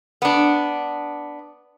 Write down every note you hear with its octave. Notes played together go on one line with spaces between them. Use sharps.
B3 D4